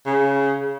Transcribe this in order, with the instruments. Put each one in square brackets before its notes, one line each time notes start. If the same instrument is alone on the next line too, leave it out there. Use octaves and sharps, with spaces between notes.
[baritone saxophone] C#3